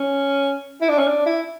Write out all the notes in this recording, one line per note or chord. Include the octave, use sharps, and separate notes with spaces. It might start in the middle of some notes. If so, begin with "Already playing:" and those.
Already playing: C#4
E4
D4
C#4
D4
E4